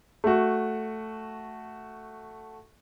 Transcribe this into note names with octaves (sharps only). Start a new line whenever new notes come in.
A3 F#4